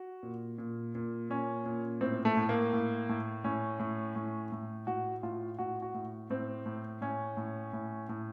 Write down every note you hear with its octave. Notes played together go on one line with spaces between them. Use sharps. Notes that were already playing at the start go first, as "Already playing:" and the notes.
Already playing: F#4
A#2
A#2
A#2
A#2 C#4
A#2
A2 C4
A3
A2
A#3
A2
A2
A2 C#4
A2
A2
A2
A2 F#4
A2 F4
A2 F#4
F#4
A2
A2 C4
A2
A2 C#4
A2
A2
A2